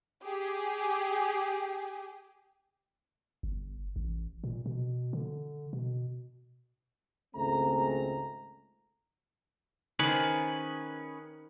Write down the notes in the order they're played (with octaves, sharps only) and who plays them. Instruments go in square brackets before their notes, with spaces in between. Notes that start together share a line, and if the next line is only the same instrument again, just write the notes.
[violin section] G4 G#4
[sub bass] G1
A1
A#2
B2
D3
B2
[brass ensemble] G#1 C#2 G#3 A3 C4 A#5
[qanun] D#3 C5 [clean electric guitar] C#4 G#4 B4